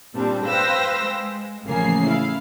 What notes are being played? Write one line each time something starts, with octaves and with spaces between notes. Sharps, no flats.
A#2 G3 C4 D4
B4 C5 F5 G5 E6 A#6
G#3
A1 C#3 F3 A#3 G#4 C7
E4 F5